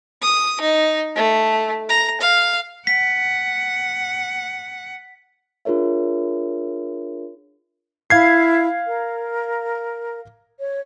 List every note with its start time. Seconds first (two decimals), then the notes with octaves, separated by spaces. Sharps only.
0.22 D#6
0.61 D#4
1.16 A3
1.89 A#5
2.21 F5
2.87 F#5 B6
5.65 D4 F4 G#4 A#4 C#5 E5
8.10 E4 F5 G#6 C7
8.86 A#4
10.59 C#5